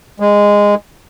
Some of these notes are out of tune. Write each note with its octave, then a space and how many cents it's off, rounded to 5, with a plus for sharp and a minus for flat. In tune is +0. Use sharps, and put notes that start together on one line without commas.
G#3 -15